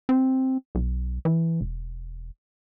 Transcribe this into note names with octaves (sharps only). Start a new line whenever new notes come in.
C4
B1
E3
E1